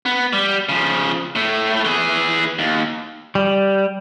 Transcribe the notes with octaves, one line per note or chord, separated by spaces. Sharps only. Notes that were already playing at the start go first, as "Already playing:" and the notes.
B3
G3
C#3 F3
A2 A3
E3 G#4
D#2
G3